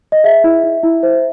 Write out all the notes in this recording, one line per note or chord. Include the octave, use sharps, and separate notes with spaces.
D#5
G#4 E5
E4
E4
E4
C5